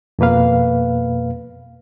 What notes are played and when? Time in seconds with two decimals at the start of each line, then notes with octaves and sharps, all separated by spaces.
0.19 F2 B2 A#3 B4 F5